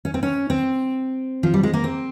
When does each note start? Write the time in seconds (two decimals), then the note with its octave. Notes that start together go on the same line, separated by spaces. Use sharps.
0.05 C#4
0.14 C4
0.23 C#4
0.50 C4
1.43 F3
1.54 G3
1.63 G#3
1.74 A#3
1.84 C4